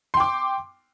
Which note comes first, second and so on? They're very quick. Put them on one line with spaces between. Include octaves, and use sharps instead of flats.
C6 G5 D6